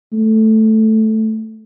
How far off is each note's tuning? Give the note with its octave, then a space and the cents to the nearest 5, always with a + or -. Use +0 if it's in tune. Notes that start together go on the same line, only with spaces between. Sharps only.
A3 -5